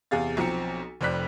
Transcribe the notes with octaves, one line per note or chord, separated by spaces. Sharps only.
E2 C3 G#4 F5 A6
B1 F3 C4 A#5 C#7
F1 F2 C5 D5 F#6 B6